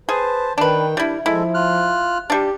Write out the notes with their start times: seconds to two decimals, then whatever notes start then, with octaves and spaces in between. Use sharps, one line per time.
0.09 G#4 B4 C5 A5
0.58 D#3 D4 B4 G5
0.97 G3 D4 E4
1.26 F3 G#3 E4 A4
1.54 F4 F6 F#6
2.30 G3 D4 G4